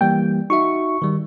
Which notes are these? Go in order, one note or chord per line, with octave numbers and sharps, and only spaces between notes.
E3 G3 A#3 G5
D#4 F#4 E5 C#6
D#3 G3